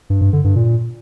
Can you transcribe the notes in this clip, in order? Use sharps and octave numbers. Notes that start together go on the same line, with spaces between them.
G2
G2
D3
G2
A#2